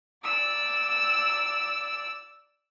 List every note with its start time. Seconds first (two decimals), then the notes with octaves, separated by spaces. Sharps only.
0.24 D5 E6